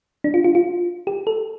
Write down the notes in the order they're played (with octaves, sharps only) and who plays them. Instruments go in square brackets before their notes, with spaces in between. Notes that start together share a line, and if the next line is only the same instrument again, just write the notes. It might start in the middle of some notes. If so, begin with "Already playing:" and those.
[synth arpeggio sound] D4
F4
F4
F4
G4
A4